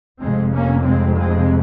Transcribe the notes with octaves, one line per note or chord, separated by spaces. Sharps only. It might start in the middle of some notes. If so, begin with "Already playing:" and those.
F1 F2 C3 G#3 C4
A#3 C#4
G#3 C4
G#3 C4